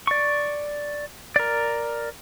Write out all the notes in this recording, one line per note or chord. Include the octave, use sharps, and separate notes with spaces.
D5 C#6
A#4 D5